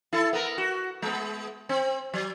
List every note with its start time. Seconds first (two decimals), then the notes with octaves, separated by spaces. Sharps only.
0.13 E4 A4
0.33 B3 A#4
0.58 F#4
1.02 G#3 B3
1.69 C4
2.14 F#3